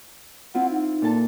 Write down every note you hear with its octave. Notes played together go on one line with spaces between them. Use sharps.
C4 E4 F4 F#5
D#4
A#2 A4 A5